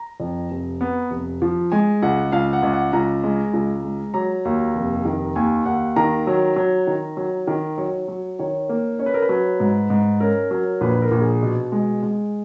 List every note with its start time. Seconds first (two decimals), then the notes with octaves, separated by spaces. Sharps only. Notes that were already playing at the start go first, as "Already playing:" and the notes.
Already playing: A#5
0.20 F2
0.51 F1
0.81 B3
1.11 F1
1.42 F3
1.72 G#3 G#5
2.02 C#2 F#5
2.32 C#2 F5
2.53 F#5
2.63 C#2
2.73 F#5
2.93 C#2 A#5
3.24 G#3
3.53 C#2
3.84 G#3
4.14 F#3 A#5
4.45 D#2
4.75 F1
5.05 D#3
5.36 D#2 G#5
5.66 D#2 F#5
5.96 D#3 A#5
6.27 F#3
6.56 F#3
6.87 D#3
7.17 F#3
7.47 D#3
7.78 F#3 C#5
8.08 F#3
8.39 D#3 C#5
8.69 A#3
8.99 C#4 C#5
9.06 B4
9.14 A#4
9.22 B4
9.29 F#3
9.60 G#2
9.90 G#2
10.20 C#4 A#4
10.51 F#3
10.81 A#1 B4
11.02 A#4
11.11 A#1
11.21 G#4
11.42 B2
11.72 G#3
12.03 G#3